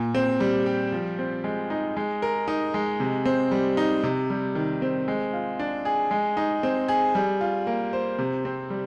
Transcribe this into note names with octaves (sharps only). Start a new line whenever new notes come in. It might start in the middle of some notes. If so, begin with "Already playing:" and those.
Already playing: A#2
C4
G3
G4
F3
C4
G#3
D#4
G#3
A#4
D#4
G#3
C3
C4
G3
D#4
C3
G3
D#3
C4
G#3
F4
D4
G#4
G#3
D#4
C4
G#4
G3
F4
A#3
C5
C3
C4
G3